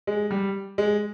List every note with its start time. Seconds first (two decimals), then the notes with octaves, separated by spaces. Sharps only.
0.07 G#3
0.31 G3
0.78 G#3